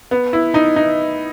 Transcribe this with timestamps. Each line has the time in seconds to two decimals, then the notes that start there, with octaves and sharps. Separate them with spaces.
0.11 B3
0.33 E4
0.54 D#4
0.76 D#4